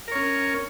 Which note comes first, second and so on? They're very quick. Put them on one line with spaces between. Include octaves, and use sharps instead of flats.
A#4 C#5 C#4